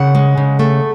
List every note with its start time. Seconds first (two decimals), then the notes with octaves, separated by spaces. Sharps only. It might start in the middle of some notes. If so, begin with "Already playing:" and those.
Already playing: C#3 F#5
0.15 G#3
0.38 C#3
0.59 A3